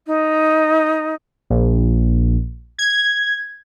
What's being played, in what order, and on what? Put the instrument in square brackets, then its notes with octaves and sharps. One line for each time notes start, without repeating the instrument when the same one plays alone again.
[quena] D#4
[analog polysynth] A#1
G#6